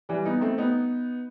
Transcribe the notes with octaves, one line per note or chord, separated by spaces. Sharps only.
E3 G3
B3 D#4
A3 C4
B3 D#4